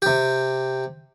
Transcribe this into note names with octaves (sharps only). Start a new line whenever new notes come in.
C3 G4